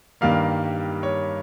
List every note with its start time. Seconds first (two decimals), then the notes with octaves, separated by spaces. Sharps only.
0.21 G2 D#3 G3 A#3 F5
1.03 C#5